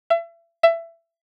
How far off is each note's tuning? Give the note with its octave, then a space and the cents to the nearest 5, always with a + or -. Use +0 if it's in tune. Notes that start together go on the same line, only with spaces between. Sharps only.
E5 +35
E5 +20